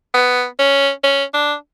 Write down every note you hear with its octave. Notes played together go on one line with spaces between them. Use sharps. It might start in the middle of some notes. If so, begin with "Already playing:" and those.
B3
C#4
C#4
D4